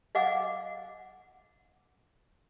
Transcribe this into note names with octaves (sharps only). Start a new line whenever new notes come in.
D#5 F5 F#5 G#5 D6